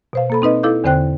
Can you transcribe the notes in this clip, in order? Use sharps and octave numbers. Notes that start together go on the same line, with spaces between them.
B2 C5 F5
A#3 A4 B5
C4 D#4 B4 D#5
E4 A4 F5 D6 G6
E2 D3 C4 C5 G5 F#6